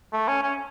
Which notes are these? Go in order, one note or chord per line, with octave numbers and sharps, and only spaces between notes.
A3
C#4
C#4